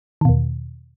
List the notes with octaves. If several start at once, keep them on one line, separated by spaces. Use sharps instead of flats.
E2 B2 D#3